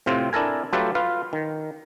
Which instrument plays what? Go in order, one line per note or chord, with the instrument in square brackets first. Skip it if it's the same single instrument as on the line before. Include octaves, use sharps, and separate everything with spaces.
[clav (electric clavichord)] A2 C3 C4 F4
D4 E4 A4 A#4 G#5
F#3 A3 F4 G4 A4 B4
F4 B4 F5
D#3